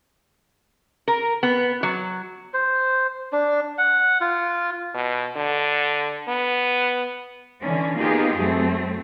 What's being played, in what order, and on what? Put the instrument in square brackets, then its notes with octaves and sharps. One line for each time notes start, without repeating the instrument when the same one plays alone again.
[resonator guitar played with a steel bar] A#4
B3
F#3
[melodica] C5
D4
F#5
F4
[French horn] B2
D3
B3
[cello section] D3 E3 C#4 D4
A#3 B3 D#4 F4 G4 G#4
F#2 F#3 A3 C4